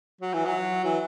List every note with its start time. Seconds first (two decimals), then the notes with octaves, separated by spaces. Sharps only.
0.21 F#3
0.34 E3
0.46 F#3
0.84 E3